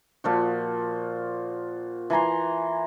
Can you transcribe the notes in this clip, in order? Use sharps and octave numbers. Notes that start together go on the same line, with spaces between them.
A#2 F3 F#4
E3 G#5 A#5 C6